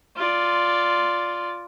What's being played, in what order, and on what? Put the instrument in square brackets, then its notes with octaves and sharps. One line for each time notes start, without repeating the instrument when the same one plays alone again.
[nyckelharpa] F4 D5